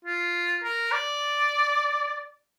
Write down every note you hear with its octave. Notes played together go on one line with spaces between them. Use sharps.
F4
A#4
D5